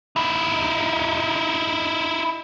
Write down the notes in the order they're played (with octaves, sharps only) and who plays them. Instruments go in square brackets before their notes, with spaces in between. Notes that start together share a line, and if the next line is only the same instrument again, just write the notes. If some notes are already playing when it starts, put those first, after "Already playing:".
[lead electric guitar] D#4 E4